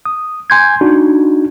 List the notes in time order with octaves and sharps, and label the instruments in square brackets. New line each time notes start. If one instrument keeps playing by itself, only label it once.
[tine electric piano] D#6
G#5 C6 G6 G#6
D4 D#4 F#4